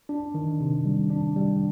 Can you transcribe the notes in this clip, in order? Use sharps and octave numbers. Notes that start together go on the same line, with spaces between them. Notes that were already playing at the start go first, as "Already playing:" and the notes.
D4
D#3
C3
G3
D4
G3